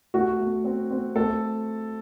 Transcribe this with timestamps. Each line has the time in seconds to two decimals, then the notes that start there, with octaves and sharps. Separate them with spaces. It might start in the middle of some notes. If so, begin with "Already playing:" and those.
0.14 A3 F#4
0.40 A3
0.64 C4
0.91 C4
1.15 A3 A4